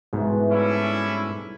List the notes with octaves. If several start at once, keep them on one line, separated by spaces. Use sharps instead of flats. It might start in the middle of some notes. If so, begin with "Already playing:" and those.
G#2 B2 E3 G3 A3
C#4 D4 E4